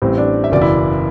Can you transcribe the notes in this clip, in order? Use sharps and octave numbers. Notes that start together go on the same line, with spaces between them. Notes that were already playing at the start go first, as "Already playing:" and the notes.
A1 A2 G3 C4
D4 D5
E5
F#1 E2 B2 D5
E4 E5